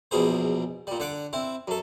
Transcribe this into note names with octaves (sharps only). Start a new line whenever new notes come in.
A#1 E2 B2 G#4 C5
A#2 G3
D3 F#5 D6
C4 E4
F#2 A4